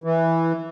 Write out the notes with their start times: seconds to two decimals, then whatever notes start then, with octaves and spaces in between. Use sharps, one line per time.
0.04 E3